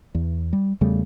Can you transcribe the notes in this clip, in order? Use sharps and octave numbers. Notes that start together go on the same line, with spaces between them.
E2
G3
E2 C#3 G3 A3